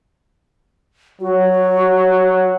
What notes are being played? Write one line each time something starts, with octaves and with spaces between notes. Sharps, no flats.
F#3 F#4